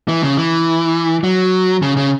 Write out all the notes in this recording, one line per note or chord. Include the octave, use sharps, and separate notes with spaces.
E3
C#3
E3
F#3
C#3
C#3